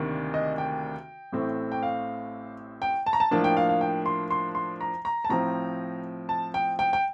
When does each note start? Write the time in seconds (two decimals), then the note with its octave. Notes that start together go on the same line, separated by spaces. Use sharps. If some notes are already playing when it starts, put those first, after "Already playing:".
Already playing: D2 C3 D#3 A#3 D4
0.34 D#5
0.58 G5
1.32 A1 A2 A3 C4
1.72 G5
1.83 F5
2.82 G5
3.06 A5
3.13 A#5
3.20 A5
3.31 A2 F3 A#3 D4 A5
3.44 G5
3.57 F5
3.69 F5
3.81 G5
4.06 C6
4.31 C6
4.55 C6
4.81 A#5
5.05 A#5
5.24 A5
5.29 A2 F3 C4 A#5
6.29 A5
6.54 G5
6.79 G5
6.93 G5